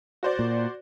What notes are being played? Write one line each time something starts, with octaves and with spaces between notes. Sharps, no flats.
F#4 C5 D5
A#2